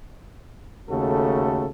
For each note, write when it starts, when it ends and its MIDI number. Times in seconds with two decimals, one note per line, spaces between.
0.90 1.67 39
0.90 1.67 49
0.90 1.67 57
0.90 1.67 66
0.90 1.67 69